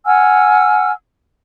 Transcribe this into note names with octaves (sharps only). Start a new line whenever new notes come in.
F#5 G#5 E6 F6